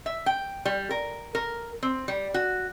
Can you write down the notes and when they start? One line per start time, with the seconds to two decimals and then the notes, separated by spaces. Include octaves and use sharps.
0.06 E5
0.26 G5
0.66 G3
0.91 A#4
1.35 A#4
1.83 C4
2.08 G3
2.34 F#4